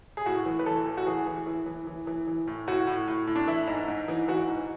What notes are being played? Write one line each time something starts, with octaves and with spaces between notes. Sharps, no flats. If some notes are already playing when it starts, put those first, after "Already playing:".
G#4
A2 F#4
E3
B4
E3 A4
A2
F#4
E3 G#4
E3
E3
E3
E3
E3
E3
A2
A2 F#4
A2
A2
A2
D4
E3 E4
G#2
G#2
E3
E3 F#4
G#2